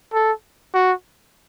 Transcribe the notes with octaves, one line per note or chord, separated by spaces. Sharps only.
A4
F#4